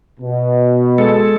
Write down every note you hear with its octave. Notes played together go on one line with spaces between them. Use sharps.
B2
G#3 A4